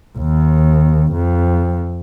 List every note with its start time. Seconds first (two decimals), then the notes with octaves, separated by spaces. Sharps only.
0.18 D#2
1.13 F2